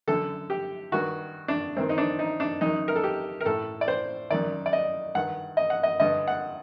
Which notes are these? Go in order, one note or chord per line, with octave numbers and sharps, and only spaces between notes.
F#2 D3 A4
G4
G2 D#3 F#4
D4
G2 D#3 C4
D#4
D4
D#4
D4
F#2 D#3 D#4
A#4
A4
G4
A#4
A2 A4
D5
C5
F#2 D#3 D5
D5
D#5
G2 D#3 F#5
D#5
F#5
D#5
G2 D3 D#5
F#5